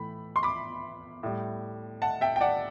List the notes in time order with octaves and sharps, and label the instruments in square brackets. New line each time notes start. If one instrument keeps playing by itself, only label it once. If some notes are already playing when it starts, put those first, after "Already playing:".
Already playing: [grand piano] A2 E3 A3 B5
C6
B5 D6
A2 G3
F#5 A5
E5 G5
G5
D5 F#5